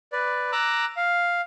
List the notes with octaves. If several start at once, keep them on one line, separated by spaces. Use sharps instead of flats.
B4 D5
A#5 D6 E6 F#6
F5